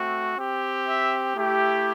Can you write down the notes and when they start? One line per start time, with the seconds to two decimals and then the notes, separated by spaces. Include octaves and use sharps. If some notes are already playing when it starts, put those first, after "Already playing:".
Already playing: A3 C4 F#4
0.37 C4 G4
0.86 E5
1.35 A3 E4 G4